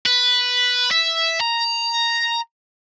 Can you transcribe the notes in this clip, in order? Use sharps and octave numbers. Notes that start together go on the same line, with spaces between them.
B4
E5
A#5